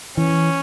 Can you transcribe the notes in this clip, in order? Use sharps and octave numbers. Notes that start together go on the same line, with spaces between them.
E3 C#4